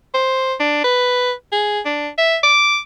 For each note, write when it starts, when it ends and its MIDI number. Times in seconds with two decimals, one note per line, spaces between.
0.14 0.54 72
0.60 0.83 62
0.84 1.32 71
1.52 1.80 68
1.85 2.08 62
2.18 2.37 76
2.43 2.78 86